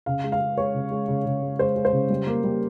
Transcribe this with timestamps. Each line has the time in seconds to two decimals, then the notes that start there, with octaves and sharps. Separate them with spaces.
0.06 C#3 F5
0.24 G#3
0.32 F5
0.41 G#3
0.57 G#3 C#5
0.74 C#3
0.91 G#3
1.08 C#3
1.26 C#3
1.42 G#3
1.59 G#3 C5
1.76 G#3
1.85 C5
1.93 C#3
2.10 G3
2.27 A#3
2.44 G3